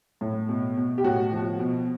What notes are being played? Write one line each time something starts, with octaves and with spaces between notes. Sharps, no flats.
A2
B2
B2
G4
A2 F#4
F3
B2